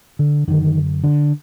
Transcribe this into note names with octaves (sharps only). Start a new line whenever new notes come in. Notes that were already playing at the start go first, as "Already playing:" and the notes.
D3
F#2 D3 D#3
D3